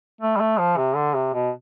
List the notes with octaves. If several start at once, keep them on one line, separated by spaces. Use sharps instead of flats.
A3
G3
A3
F3
C3
D3
C3
B2